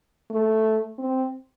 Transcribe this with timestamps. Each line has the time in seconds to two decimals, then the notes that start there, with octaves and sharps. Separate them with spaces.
0.30 A3
0.99 C4